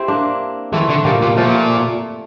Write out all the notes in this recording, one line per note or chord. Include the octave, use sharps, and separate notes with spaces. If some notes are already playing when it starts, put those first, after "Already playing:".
Already playing: C4 E4 G4
A#3 D4
E3 A3 C4
D3
A#2 G3 A#3
A#2
A#2 F3 A3